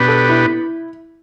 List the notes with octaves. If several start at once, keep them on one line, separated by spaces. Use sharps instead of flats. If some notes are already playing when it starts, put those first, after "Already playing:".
Already playing: B2 B3 D4 G4 B4
A4
E4